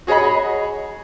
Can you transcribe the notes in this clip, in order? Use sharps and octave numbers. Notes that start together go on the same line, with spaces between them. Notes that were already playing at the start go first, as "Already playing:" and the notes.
F#4 G#4 C#5 D#5 B5